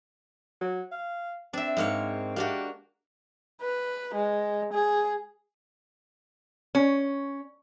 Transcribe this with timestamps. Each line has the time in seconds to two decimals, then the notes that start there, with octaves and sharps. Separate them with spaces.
0.61 F#3
0.92 F5
1.53 C4 D4 E5
1.77 G#2 A#3 C#5
2.36 A#3 D4 F#4 G4
3.62 B4
4.15 G#3
4.73 G#4
6.75 C#4